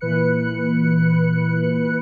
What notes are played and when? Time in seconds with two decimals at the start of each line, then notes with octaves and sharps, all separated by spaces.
0.01 A#2 E3 B4 F#6 C#7